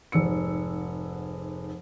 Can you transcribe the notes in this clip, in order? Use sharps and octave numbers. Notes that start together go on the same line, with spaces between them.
F1 G#2 E6 C#7